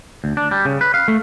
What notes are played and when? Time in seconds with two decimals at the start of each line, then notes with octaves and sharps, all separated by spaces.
0.24 D2
0.37 D4
0.51 G3
0.65 C#3
0.81 B4
0.94 F5
1.08 A3